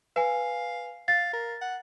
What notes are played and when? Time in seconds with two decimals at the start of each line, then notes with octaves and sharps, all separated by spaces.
0.16 B4 F5 G#5
1.08 F5 A6
1.33 A#4
1.61 F#5